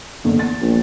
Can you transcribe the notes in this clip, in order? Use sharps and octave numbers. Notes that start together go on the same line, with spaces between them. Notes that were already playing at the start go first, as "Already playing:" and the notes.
F#1 E2 D3
E2 A6
A#1